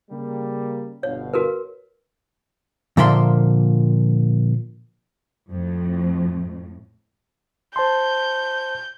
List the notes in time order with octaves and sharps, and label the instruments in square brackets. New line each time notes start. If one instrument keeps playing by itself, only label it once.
[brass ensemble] C#3 G3 A#3
[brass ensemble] G1 B2 F5 [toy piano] C#5
[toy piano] F#4 A#4 B4
[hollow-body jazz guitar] A#2 D3 F3 A#3 E5 C6
[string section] F2 A2
[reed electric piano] C5 A5 C6 [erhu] G6